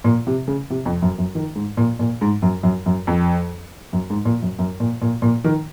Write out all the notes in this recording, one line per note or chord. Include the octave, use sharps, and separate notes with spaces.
A#2
C3
C#3
C3
F2
F#2
F#2
D#3
G#2
A#2
A#2
G#2
F#2
F#2
F#2
F2
F#2
G#2
A#2
F#2
F#2
A#2
A#2
A#2
D#3